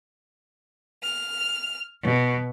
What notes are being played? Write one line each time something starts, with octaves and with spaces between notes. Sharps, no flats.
F6
B2